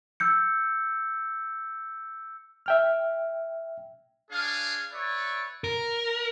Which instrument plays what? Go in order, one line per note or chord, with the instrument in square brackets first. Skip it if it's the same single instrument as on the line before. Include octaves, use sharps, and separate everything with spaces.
[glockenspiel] E6 G6 C#7
[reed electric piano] E5 G5 F6
[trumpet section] D4 G#4 C#5 F5
B4 C#5 D5 E5
[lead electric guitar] A#4